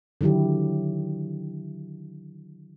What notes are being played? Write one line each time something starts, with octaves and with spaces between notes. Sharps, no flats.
D3 D#3 F#3 E4 G4